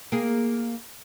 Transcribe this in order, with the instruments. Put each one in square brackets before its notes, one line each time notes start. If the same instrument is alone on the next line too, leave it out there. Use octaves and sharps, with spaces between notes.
[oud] A#3 G#4